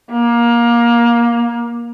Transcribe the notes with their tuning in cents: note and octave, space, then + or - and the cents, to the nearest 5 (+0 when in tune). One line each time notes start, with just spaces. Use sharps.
A#3 +20